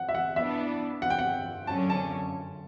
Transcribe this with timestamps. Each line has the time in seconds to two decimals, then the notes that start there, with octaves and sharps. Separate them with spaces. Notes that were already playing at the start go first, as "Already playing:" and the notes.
Already playing: F#5
0.09 E5
0.15 F#5
0.36 E3 B3 D4 E5
1.02 F#5
1.10 G5
1.19 F#5
1.67 F#2 D3 F#3 C#4 A5
1.90 A5